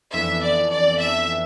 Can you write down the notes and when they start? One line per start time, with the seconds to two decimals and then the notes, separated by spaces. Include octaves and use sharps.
0.13 F2 E3 B3 D4 A4 E5
0.42 D5
0.69 D5
0.98 E5